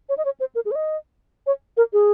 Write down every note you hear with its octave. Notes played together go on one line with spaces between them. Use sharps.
C#5
D#5
C#5
C5
A#4
G#4
C#5
D#5
C#5
A#4
G#4